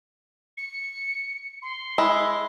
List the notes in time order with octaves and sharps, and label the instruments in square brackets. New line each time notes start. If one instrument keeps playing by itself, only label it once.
[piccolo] C#7
C6
[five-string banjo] G#3 E4